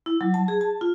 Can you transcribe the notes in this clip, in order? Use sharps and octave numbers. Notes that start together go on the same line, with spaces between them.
E4
F#3
A5
G#4
A5
F4